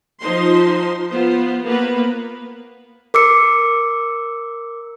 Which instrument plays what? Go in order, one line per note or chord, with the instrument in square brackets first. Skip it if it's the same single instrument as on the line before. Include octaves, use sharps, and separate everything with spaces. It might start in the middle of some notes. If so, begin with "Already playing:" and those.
[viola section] F3 D#4 C5 C6
B3 F4 C5
A#3 B3 B4
[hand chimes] A#4 D6 E6 C#7